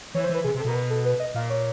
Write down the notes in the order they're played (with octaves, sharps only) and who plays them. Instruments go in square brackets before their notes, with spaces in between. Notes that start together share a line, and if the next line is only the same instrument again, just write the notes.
[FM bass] E3 [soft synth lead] C#5
[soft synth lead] C5
[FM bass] E3
[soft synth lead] B4
[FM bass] C3 [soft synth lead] G#4
[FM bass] C3
[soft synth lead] A4
[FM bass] B2 [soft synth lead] A#4
[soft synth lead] B4
A4
B4
D#5
[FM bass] A#2 [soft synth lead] F5
[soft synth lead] C#5